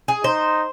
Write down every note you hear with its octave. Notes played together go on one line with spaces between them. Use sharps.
G#4
D#4 C5